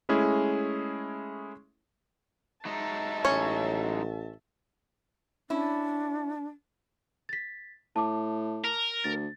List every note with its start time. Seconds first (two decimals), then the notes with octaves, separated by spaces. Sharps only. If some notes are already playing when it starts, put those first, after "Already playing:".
0.09 G#3 A3 C#4 E4 G#4
2.65 F#3 G#3 D#4 E5 A5
3.25 A1 C#4 C#5
5.50 C#4 D4 E4
7.29 A6 B6
7.96 A2 A5 D6
8.64 A#4
9.04 D2 A6